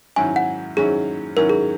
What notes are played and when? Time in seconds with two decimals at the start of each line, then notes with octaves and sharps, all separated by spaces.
0.16 G#2 D#3 F#3 C#4 E4 G#5
0.36 F#5
0.77 G#2 D#3 F#3 C#4 E4 G#4
1.36 G#2 D#3 F#3 C#4 E4 A#4
1.49 G#4